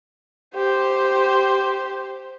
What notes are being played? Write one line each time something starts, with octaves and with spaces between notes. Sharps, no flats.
G4 C5